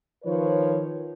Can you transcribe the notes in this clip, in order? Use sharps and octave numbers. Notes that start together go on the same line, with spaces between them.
D#3 F3 B4 C#5